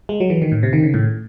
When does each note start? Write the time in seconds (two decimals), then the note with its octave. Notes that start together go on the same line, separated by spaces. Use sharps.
0.09 G#3
0.20 F#3
0.30 E3
0.42 D#3
0.52 A2
0.63 C3
0.73 D#3
0.83 C#3
0.94 A2